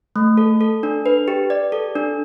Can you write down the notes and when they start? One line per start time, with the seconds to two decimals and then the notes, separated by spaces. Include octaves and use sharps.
0.16 A3
0.37 A4
0.61 A4
0.83 D4
1.06 B4
1.28 G4
1.50 D5
1.72 A4
1.96 D4